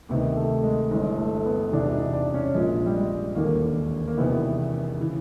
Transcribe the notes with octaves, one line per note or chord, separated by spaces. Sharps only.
D2 C3 D#3 B3
A3
G#3
G1 G2 E3 G#3
A3
B3
E1 E2 C3 E3 D4
D#4
D4
C#4
A#1 A#2 G#3
G3
G#3
E1 D#2 D3 A#3
A#3
E1 E2 C3 D#3 B3
C#3 E3